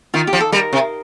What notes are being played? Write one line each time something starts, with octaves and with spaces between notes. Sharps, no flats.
D#3 F4
G4
F3
A4
G3 A#4
C3